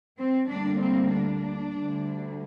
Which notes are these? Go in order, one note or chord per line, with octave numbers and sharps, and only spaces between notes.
C4
D2 D3 G3 A#3 D4
C4
D4
D2 D3 G3